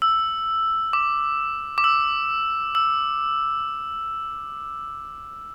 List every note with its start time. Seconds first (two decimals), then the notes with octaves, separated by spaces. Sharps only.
0.02 E6
0.93 D6
1.78 D6
1.84 E6
2.75 E6